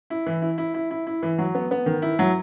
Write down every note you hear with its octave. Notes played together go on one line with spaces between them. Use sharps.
E4
E3
E4
E4
E4
E4
E4
E3
F#3
B3
B3
D#3
E4
F#3